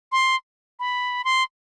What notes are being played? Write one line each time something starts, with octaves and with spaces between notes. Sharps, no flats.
C6
B5
C6